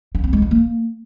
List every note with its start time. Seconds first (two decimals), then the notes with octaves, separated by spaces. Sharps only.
0.15 D4
0.24 C4
0.33 G#3
0.42 D#4
0.51 A#3